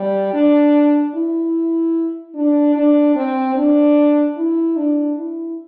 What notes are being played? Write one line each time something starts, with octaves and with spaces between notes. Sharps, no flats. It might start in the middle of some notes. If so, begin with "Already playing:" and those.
Already playing: G3
D4
E4
D4
D4
C4
D4
E4
D4
E4